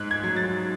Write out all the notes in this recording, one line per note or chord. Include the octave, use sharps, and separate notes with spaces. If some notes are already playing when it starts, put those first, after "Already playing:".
Already playing: G#2 F#6
G#6
F#3
A6